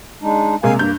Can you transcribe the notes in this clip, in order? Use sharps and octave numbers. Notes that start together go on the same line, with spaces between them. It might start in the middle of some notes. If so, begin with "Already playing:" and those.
G#3 D4 D#4
C3 G#3 A#3 F5 G#5
G2 A#3 G6